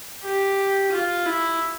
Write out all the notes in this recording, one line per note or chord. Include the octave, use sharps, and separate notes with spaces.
G4
F4
E4